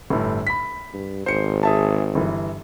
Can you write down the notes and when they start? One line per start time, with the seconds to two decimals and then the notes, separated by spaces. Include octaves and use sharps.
0.10 G1 A2
0.47 B5 B6
0.94 G2
1.26 G#1 C5 C#7
1.63 G#4 E5 A5
2.15 G1 E3